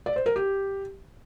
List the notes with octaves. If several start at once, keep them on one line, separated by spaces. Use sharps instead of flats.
D5
C5
A#4
G4